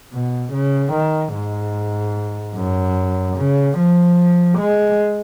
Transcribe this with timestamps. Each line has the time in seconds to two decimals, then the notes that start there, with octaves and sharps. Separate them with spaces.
0.13 B2
0.53 C#3
0.93 D#3
1.34 G#2
2.56 F#2
3.37 C#3
3.78 F3
4.58 G#3